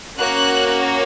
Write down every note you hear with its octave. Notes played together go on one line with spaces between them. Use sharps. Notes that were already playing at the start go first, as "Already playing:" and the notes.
A#3 C#4 F#4 F#6